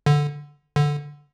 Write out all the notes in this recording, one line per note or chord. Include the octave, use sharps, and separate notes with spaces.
D3
D3